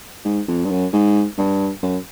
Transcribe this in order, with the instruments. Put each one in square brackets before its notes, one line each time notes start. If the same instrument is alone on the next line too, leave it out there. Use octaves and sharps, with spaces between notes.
[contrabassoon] G#2
F2
G2
F#2
G#2
G2
F#2